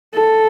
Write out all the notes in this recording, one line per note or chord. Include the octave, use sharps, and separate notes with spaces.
A4